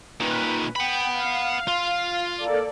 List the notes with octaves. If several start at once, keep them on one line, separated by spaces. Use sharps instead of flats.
A#2 D#3 B4
F#5 G5 B5
F5
F4
A#3 A4 D5